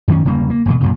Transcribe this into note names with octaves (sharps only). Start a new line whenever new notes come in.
F#2 D#3 C#4
E1 C#3 G3 A#3
A#3
E1 G#2 B2
F#2 A#2 C#3